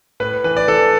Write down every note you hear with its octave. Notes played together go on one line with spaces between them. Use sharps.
A2 B4
E3 B4
D5
E3 A4